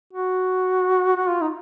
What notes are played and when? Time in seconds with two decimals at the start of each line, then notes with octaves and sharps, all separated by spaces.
0.13 F#4
1.16 F#4
1.28 F4
1.41 D#4